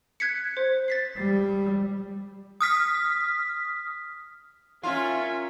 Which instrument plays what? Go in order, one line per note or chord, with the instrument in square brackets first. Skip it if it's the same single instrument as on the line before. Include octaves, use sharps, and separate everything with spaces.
[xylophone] F#6 G#6 B6 C#7
C5
A6 B6 C7
[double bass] G3
[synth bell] D#6 F6 B6
[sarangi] C#4 [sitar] F4 [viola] A#4 E5